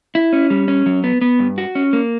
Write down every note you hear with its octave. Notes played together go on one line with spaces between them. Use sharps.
E4
C#4
G3
C#4
F#3
B3
B3
G2
F#4
C#4
A#3